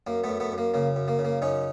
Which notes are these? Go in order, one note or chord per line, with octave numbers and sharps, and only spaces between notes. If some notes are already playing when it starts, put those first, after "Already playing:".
F#2 A#3
A3 B3
F#2
A3 B3
F#2
A#3
C#3 A#3
F#2
A#3
C#3
A#3
F#2 C#4 D#4